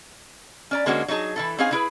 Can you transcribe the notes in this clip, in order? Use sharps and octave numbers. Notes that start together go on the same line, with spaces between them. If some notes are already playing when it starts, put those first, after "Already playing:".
C#4 D5 A#5
D3 G#3 A#3 C4 C#4 F#4
F#3 A3 D#4 G#4 A5
E3 E4 A4
C4 C#4 D#4 G#4 F5 G#5
D3 E4 G#4 B4